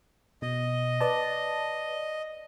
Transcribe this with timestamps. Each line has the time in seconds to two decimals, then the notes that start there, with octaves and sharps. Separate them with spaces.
0.42 B2 D#5
1.00 B4 D5 A5